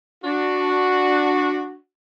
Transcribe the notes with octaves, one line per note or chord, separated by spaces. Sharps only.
D4 F#4